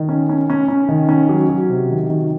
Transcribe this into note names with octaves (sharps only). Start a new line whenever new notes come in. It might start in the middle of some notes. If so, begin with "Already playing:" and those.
Already playing: D#3
C#4
C#4
C#4
C#4
D#3
C#4
F#3
F#3
C3
D#3
D#3